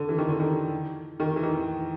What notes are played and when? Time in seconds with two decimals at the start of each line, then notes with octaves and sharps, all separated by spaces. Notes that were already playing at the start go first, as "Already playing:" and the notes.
Already playing: D3
0.09 E3
0.18 D#3
0.29 D3
0.39 D#3
1.20 D#3
1.36 E3
1.43 D#3